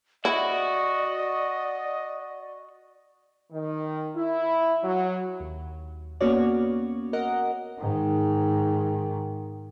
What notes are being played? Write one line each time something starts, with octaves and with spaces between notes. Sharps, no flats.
E4 F#4 D5 D#5
D#3
E4
F#3
D#2
A#3 B3 C#4 F#4 C#5 D5
A#4 D#5 F#5
G#2 D#3